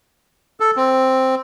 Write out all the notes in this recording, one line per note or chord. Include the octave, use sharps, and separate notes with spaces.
A4
C4